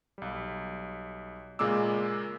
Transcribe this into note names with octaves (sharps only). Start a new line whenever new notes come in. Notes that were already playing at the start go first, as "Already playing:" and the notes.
B1 G3
A#2 C#3 G#3 A#3 D6 E6